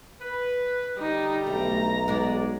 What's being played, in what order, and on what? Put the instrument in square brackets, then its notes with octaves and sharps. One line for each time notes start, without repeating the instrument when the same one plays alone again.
[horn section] B4
[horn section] D3 G3 [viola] D#4
[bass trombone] B1 [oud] A3 [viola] A#5
[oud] G#3 B3 [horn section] D#4 D5